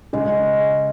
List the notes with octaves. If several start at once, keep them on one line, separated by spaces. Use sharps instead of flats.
C#3 G#3